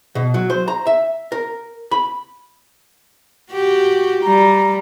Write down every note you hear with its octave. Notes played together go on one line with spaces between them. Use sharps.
B2
F#3
C5
A#5
E5
A#4
B5
F#4 G4
G3 A#5